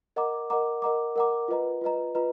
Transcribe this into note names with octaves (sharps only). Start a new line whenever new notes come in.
A#4 D#5 F#5 A#5 D6
A#4 D#5 F#5 A#5 D6
A#4 D#5 F#5 A#5 D6
A#4 D#5 F#5 A#5 D6
F4 B4 D#5 A#5
F4 B4 D#5 A#5
F4 B4 D#5 A#5